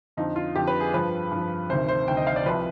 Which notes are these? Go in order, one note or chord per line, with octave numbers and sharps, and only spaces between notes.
F2 D3 F3 D#4
F4
F2 D3 F3 G4
B4
G#4
G2 F3 B4
G2 F3
D2 C3 D#3 C5
C5
D2 C3 D#3 G5
D#5
F5
D5
C2 C3 F3 B4